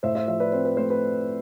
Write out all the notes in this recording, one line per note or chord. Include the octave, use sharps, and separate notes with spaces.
A2 C5 E5
C5 E5
F3 C5 E5
B4 D5
C4 C5
B4
A3 C5
B4